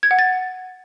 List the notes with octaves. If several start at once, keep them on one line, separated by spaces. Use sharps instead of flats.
G#6
F#5
A6